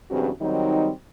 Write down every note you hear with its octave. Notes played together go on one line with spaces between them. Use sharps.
E2 G2 C#3 F#3 C4 F#4
D#3 F#3 G3 C4 D#4